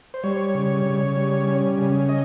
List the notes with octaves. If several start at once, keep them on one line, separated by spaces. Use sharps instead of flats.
C5
G3 C#5
C#3
C#3
G3
C#4
C#3
D#5